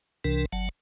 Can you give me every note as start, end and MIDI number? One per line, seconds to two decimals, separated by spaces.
0.24 0.46 36
0.24 0.46 48
0.24 0.46 52
0.24 0.46 62
0.24 0.46 70
0.53 0.69 31
0.53 0.69 54
0.53 0.69 78
0.53 0.69 81